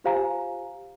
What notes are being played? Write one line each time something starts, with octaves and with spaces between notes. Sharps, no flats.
F4 G4 C5 F5 G#5 A#5